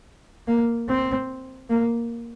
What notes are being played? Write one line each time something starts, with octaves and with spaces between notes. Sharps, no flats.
A#3
C4
A#3